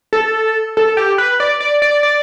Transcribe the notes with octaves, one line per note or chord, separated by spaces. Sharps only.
A4
A4
G4
B4
D5
D5
D5
D5